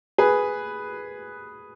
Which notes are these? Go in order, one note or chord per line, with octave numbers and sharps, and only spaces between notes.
G#4 B4